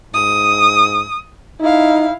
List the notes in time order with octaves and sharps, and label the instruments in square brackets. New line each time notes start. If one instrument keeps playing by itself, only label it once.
[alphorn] G#2 [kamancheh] D#6
[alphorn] D#4 [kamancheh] E4 F5